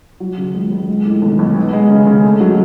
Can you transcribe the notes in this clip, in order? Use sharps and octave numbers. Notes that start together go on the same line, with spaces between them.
F#3
C#3
C#2
C#2
G#3
A2
B1
B1
B3
G#3
C#3
C#3
A3
F#3